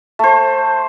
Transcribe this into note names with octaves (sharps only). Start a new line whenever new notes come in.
A3 C5